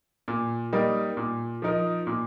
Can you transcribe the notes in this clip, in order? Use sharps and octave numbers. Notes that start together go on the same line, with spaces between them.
A#2
G3 A#3 D#4
A#2
F3 D#4 A#4
A#2